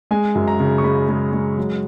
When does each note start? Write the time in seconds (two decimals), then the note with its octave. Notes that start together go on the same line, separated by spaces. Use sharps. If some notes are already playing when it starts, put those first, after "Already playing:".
0.11 G#3 G#5
0.35 F#2
0.48 A#5
0.60 C#3
0.78 C#6
0.84 G#3 B5
1.09 G#3
1.33 G#3
1.58 F#3